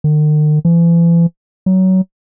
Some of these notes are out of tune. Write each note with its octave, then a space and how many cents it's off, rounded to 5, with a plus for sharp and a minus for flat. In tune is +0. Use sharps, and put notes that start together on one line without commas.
D#3 -45
E3 +40
F#3 +20